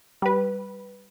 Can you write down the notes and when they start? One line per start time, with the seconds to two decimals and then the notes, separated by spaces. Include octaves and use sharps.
0.22 G3 B4